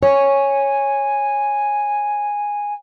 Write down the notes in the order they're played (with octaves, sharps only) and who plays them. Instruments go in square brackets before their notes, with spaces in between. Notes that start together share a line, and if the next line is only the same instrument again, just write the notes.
[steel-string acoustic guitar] C#5 [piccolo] G#5